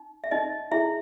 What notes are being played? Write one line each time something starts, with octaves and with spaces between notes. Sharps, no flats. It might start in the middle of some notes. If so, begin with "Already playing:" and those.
Already playing: D#4
E5
D#4 D#5
E4 G#4 E5